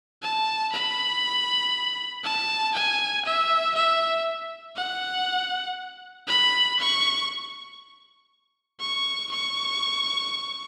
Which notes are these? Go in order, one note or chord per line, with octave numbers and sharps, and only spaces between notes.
A5
B5
A5
G#5
E5
E5
F#5
B5
C#6
C#6
C#6